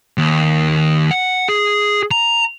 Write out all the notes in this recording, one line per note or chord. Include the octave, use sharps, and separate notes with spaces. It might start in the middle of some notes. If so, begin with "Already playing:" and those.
D#2
F#5
G#4
A#5